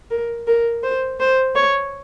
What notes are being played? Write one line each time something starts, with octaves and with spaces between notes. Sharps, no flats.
A#4
A#4
C5
C5
C#5